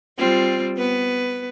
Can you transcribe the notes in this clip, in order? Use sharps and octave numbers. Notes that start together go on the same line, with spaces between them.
G3 C4 F4
B3 B4